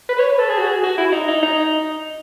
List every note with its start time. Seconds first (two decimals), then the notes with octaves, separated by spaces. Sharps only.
0.09 B4
0.19 C#5
0.29 B4
0.39 A4
0.49 G#4
0.58 F#4
0.67 G#4
0.83 F#4
0.98 E4
1.12 D#4
1.28 D#4
1.43 D#4